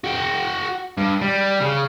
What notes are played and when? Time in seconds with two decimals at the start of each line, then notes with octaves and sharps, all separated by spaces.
0.04 F#4 G5
0.97 G2
1.22 G3
1.61 C#3